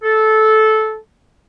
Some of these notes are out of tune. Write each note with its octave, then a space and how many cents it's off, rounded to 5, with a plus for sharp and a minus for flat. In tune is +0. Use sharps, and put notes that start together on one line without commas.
A4 -15